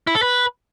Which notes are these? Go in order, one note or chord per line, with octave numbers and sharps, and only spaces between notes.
E4
A4
B4